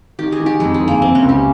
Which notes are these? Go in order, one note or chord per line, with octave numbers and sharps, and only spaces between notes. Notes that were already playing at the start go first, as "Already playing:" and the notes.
D#3 G4
G#4
D#3
G4
F2 G#3
G#3
G1
A#3
C3 C4
C#4
C#2
G4